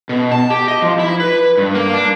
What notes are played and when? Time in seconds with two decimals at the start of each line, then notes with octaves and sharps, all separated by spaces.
0.09 B2
0.32 A5
0.50 G4
0.68 D#5
0.82 F3
0.99 E4
1.20 B4
1.57 G2
1.75 A#3
1.93 D4